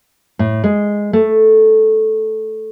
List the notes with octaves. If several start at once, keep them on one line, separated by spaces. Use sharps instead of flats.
A2
G#3
A3